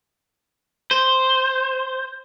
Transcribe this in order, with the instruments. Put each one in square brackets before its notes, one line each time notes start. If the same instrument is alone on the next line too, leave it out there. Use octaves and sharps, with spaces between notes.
[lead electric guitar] C5